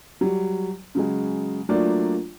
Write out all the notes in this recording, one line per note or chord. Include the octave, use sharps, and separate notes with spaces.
F#3 G3
C#3 F#3 G#3
F#3 A3 A#3 D4 F4 D5